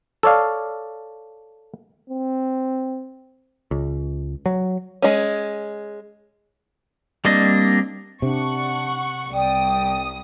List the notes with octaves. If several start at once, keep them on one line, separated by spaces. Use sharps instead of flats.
A4 C#5 D5 F5
C4
C#2
F#3
G#3 C#4
G3 A#3 C4 D4 D#5
C3 D4 F#5 C#6
C2 D5 G5 D#6